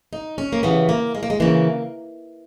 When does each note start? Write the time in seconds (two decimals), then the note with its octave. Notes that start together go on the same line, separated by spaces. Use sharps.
0.13 D#4
0.38 C#4
0.53 A#3
0.63 D#2 C#3 E3 B3
0.89 A#3
1.15 G#3
1.23 A#3
1.30 G#3
1.40 C#3 E3 A#3